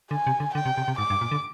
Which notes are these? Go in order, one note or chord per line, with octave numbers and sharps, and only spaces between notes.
D3 G#5
C3
D3
D3 G5
C3
C3
C3
G#2 D6
G2
A#2
D3